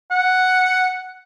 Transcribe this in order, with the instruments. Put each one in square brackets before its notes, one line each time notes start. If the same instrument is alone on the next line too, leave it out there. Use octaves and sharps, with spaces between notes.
[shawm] F#5